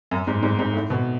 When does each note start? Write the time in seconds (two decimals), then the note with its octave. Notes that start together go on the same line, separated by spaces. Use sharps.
0.11 F#2
0.27 G#2
0.43 G#2
0.59 G#2
0.74 A2
0.90 B2